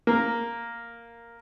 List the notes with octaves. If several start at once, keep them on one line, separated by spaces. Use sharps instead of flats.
A#3